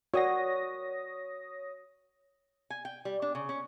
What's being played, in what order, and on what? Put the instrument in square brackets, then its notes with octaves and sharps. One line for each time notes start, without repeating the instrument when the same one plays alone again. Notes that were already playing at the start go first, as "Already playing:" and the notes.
[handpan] F#4 [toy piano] A#4 D5 F#5 [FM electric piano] C#5 D#6 A#6
[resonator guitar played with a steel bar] G#5
G5
G3
D4
C#3
C#4